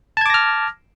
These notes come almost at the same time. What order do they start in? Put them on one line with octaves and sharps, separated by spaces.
A5 G#6 D6 A#6 F6